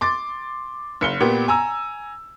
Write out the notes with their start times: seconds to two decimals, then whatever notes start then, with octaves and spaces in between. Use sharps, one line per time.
0.01 C6 D6 A6
1.01 F#1 C#7 G7
1.20 A#2 B3 G4
1.48 G#5 A#5 E6